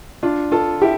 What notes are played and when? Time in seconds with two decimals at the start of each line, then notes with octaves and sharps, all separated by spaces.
0.23 D4 F4
0.52 F4 A4
0.82 E4 G4